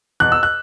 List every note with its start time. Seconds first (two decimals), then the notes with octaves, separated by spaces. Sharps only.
0.20 E2 B2 F#6
0.32 E6
0.43 F#6